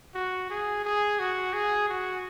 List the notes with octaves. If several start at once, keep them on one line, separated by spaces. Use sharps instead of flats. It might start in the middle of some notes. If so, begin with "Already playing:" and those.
F#4
G#4
G#4
F#4
G#4
F#4